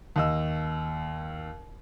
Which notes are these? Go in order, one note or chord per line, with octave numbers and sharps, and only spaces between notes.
D#2 D#5 E6